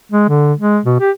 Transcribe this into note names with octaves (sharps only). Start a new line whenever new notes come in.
G#3
D3
G#3
B2
G4